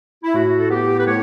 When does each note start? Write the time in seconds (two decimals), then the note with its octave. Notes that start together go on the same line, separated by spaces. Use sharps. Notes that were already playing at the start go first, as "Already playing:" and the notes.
0.24 E4
0.34 A2 F#4
0.59 A4
0.70 B3 G4
0.99 B4
1.07 A2 C#5